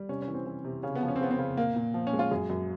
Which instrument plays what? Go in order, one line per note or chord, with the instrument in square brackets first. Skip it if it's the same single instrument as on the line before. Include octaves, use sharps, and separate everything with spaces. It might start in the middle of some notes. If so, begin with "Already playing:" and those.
Already playing: [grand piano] G3
C3 C#4
C#4
E3
C4
E3
C3
C#3 C#4
B3
F3
C#4
C4
C#3 B3
C4
C#3
A#2 A#3
A#2
F3
C#4
G#3
F4
F#2 G#4
F#2